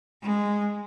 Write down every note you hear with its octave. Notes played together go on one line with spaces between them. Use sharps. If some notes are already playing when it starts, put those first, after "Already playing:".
G#3